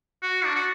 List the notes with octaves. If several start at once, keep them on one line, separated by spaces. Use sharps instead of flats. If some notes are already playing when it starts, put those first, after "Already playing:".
F#4
D4
F#4